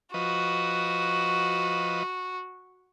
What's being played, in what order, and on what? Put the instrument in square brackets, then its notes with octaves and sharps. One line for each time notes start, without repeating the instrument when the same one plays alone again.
[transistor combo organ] F3 B4 D#5 [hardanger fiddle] F#4